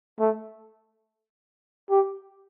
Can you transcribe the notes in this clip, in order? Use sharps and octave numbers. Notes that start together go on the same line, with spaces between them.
A3
G4